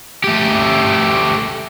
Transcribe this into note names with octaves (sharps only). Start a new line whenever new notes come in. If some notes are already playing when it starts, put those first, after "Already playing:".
A3 G4